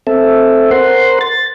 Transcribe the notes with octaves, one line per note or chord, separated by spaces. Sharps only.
C4 A4 E5
A#4 C5 F#5 C6
A6